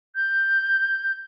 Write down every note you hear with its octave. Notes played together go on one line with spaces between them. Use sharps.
G6